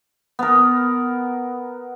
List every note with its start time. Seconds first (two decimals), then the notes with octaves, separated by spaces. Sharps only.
0.39 B3 A#4